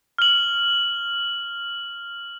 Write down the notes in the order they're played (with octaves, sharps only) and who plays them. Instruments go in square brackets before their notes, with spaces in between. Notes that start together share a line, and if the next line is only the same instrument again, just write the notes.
[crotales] F6 F#7